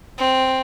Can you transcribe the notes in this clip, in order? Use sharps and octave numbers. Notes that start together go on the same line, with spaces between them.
C4